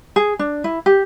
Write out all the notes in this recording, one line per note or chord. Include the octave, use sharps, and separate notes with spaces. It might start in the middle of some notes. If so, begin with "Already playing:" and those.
G#4
D4
E4
G4